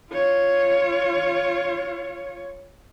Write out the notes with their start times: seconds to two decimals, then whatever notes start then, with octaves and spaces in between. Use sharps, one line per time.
0.11 F4 C#5